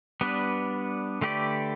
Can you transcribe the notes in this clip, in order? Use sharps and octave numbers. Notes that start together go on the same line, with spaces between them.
G3 B3 D4 B4
D3 A3 G4 B4 D5